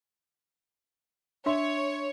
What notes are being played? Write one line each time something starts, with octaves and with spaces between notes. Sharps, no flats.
D4 C#5 E5 C6